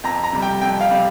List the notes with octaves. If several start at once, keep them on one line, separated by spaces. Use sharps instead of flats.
F2 A#5
A#5
C3 G3
G5
F2 G5
F5
C3 G3